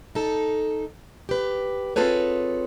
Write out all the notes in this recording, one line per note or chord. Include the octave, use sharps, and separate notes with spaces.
D#4 A4
G4 B4
C4 F4 G#4 A4 B4 C#5